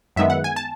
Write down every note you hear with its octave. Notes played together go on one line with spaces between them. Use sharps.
F#2 D#3 G#3 B3 E5
F#5
G#5
A5